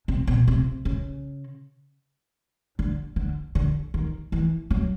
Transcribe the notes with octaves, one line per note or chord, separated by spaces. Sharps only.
C3
B2
C3
C#3
D3
D3
D3
D#3
E3
F#3